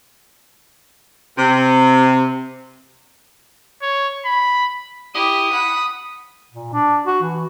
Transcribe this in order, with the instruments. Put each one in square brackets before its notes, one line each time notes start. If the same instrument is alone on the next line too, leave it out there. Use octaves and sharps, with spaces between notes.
[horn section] C3
[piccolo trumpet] C#5
B5
[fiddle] E4 G4 [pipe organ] D#6
[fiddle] F#5 B5
[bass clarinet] A#2
D4
F#4
E3